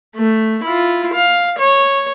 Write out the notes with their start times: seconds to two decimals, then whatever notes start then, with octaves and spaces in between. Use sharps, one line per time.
0.16 A3
0.64 E4 F4
1.14 F5
1.59 C#5